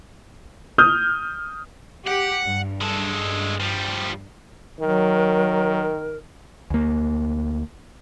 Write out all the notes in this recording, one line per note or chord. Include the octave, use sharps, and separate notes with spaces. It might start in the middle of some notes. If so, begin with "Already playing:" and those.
D#6 F6 G6
G4 F#5
G2
G#3 A4
F3 G3
D#3 F#3 A#4
D2 A#3